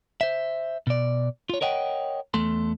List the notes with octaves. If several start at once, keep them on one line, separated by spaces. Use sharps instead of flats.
C5 E5
B2 D5
F4 C#5
A#4 C#5 D#5 F#5 G5
E2 A3 A4 C6